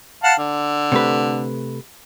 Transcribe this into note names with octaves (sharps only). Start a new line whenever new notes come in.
F5 F#5 A5
D3
C3 A3 B4